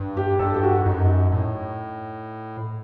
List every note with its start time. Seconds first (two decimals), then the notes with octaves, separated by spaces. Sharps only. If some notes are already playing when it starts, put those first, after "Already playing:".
Already playing: G2
0.17 G4
0.39 G2 A4
0.54 G4
0.63 F#4
0.76 F#4
0.85 F#2 D#4
1.32 A2